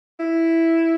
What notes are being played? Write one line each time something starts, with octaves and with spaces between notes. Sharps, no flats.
E4